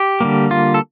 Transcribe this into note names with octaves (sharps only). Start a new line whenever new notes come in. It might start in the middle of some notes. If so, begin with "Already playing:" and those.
Already playing: G4
D3 G3 A#3
F4
A4